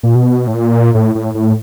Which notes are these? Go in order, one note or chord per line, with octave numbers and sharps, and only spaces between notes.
A#2
B2
A2
A#2
A2
A2
A2